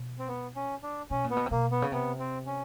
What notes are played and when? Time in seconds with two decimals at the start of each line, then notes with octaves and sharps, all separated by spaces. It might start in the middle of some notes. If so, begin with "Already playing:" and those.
Already playing: B2
0.19 C4
0.28 B3
0.56 C#4
0.83 D4
1.10 B2 C#4
1.24 A#2
1.31 B3
1.37 B2
1.46 C3
1.51 B2 A#3
1.71 B3
1.82 C#3
1.92 C3 B3
2.19 C4
2.46 C#4